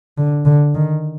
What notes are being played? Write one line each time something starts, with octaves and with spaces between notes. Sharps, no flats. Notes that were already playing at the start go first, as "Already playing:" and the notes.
D3
D3
D#3